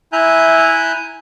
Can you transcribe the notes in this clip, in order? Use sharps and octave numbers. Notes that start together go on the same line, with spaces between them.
E4 E5 G#5 A#5 F#6 G6